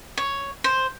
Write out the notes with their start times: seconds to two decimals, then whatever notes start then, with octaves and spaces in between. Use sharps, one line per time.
0.17 C#5
0.64 C5